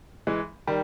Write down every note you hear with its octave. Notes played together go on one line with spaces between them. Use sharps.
E3 G#3
D#3 G3